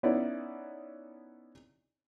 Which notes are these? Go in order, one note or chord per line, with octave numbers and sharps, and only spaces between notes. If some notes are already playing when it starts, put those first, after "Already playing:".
B3 C#4 D#4 E4 D5